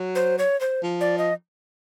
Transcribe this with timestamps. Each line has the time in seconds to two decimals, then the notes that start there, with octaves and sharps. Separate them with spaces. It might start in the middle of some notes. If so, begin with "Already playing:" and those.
Already playing: F#3
0.15 C5
0.39 C#5
0.61 C5
0.83 F3
1.01 D5
1.18 D#5